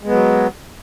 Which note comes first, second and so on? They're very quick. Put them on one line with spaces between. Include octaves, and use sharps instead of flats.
G#3 B3 F#3